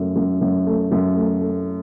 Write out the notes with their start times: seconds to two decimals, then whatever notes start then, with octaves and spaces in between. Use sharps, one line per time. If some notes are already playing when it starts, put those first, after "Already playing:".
Already playing: F#2 A3
0.16 F#2
0.41 F#2
0.67 A3
0.92 F#2
1.16 A3
1.41 A3